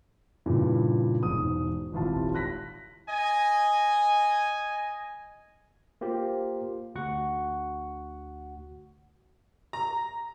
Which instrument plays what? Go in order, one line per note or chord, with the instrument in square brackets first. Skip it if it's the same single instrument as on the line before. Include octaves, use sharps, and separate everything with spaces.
[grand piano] G2 A#2 C#3 E3
E1 G#2 D#6
D#1 G#1 E4 F4 A5
F#6 A#6 B6
[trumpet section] D#5 G#5
[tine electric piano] A#3 F4 G4 C5
D2 F#4 F#5 C#6
[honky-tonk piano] A#5